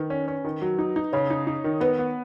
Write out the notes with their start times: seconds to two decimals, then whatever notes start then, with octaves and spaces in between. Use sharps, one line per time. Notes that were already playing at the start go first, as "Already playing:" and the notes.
Already playing: D#3 B4
0.10 C#4
0.28 C#4
0.44 D#3
0.62 F#3
0.79 D#4
0.96 D#4
1.13 C#3 C#5
1.30 D#4
1.47 D#4
1.64 D#3
1.80 B3 B4
1.99 B3